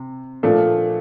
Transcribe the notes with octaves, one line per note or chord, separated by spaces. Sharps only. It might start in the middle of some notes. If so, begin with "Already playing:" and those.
Already playing: C3
A#2 F3 A3 D4